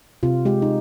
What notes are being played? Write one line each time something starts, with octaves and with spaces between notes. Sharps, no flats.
C3 F4
G#3 G4
D#4